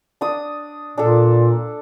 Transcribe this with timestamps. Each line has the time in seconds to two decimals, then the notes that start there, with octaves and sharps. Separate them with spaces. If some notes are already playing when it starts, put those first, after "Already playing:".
0.21 D4 D#6
0.98 A#2 D4 A4